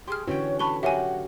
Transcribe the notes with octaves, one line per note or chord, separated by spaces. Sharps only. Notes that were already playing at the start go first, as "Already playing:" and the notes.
G4 G#4 C6 F6
D3 E3 C#4 F#4 C#5 G5
B4 C#5 A5 B5 C#6 G7
F#3 G4 A#4 E5 F#5 G#5